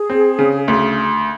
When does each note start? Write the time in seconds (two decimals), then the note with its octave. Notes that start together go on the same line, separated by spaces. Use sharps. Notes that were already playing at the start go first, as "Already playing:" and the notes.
Already playing: G#4
0.10 C4
0.39 C#3
0.68 D2